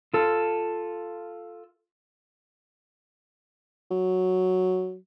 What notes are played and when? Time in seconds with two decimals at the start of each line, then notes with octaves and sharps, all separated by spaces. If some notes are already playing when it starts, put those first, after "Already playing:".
0.13 F4 A4
3.91 F#3